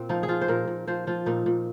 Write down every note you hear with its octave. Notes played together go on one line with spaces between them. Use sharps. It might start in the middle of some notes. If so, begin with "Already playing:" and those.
Already playing: A#2 C4
F3 D#4
G#4
F3 F4
C5
A#2 A#4
A#2
F3 C5
F3 F4
A#2 D#4
A#2